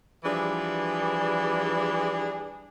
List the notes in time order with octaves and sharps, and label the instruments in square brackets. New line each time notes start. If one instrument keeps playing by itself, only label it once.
[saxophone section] E3 F3 G3 D4 G#4